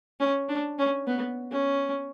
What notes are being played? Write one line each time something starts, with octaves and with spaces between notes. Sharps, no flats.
C#4
D4
C#4
B3
C#4